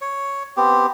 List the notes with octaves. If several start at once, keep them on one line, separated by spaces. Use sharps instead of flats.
C#5
B3 C4 G4